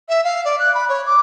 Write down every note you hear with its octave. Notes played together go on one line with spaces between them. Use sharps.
E5
F5
D5
F#6
B5
C#5
D6